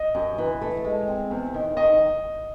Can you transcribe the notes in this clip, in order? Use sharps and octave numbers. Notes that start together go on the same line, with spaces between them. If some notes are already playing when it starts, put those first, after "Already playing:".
Already playing: D#5
F#2
E3
A3
G#3
C4
E2
D#3
D#3 D#5